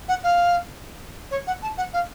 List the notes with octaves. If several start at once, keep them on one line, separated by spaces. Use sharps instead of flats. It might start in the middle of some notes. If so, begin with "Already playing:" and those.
F#5
F5
C#5
F#5
A5
F#5
F5